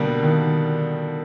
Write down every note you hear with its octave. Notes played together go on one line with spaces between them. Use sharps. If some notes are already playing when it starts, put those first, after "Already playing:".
Already playing: B2 D3 G3 A#3
D#3